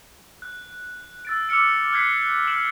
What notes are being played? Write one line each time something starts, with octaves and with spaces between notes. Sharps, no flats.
F#6
E6 A6 D7
D6 E6 F6 C#7 D7
F6 F#6 G#6 B6 C7
F6 D7 E7 F#7